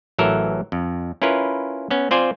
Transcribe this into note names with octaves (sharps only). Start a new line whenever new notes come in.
A1 E3 F#3 A4 A#4 E5
F2
C#4 E4 F4 A#4 B4
B3 C#4
C4 F4 C5 D5 G#5